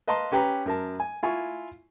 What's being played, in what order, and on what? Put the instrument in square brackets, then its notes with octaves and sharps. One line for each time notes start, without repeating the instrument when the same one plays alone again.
[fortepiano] B4 D#5 F5 A5 A#5 C6
C#4 G4 B4 G5 A#5
F#2 A#4 A5
G#5
E4 F4 G#5 C#6